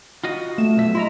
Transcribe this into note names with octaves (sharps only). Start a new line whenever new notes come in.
F4 F#4 D#5
A3 E7
B1 E5
E4 F4 D#5 A#5